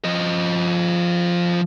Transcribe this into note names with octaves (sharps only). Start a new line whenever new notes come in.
F3 D#5